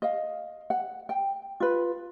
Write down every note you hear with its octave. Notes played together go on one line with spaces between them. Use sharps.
D#5 F5
F#5
G5
F4 B4